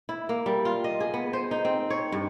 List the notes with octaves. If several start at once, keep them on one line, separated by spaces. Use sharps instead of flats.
E4
A#3
G3
F4
D#5
G#4
B3
C5
D#4
C4
C#5
G2